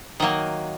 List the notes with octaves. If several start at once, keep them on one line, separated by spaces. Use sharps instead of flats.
D#3 F#3 A#3 D#5